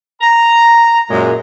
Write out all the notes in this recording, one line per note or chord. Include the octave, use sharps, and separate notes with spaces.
A#5
F#2 A#2 G#3